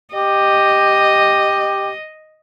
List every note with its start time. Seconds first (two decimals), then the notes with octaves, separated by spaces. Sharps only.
0.15 G4 D#5